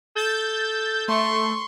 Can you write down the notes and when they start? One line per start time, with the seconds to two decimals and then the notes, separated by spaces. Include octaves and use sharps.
0.16 A4 G6 A6
1.08 A3 C6 C#6